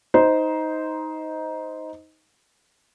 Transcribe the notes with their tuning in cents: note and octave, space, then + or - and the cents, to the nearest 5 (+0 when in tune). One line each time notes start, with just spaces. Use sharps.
D#4 +15 C5 -10